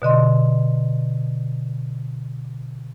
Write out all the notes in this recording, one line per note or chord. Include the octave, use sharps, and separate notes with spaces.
B2 D3 D#5 C6